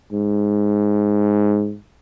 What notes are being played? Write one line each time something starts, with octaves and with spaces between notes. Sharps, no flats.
G#2